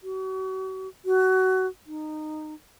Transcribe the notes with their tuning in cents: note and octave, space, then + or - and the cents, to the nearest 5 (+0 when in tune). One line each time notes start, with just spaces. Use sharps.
F#4 +40
F#4 +20
D#4 -15